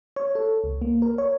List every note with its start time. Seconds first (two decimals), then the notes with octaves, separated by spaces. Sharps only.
0.16 C#5
0.35 A4
0.64 C#2
0.82 A#3
1.02 A#4
1.18 C#5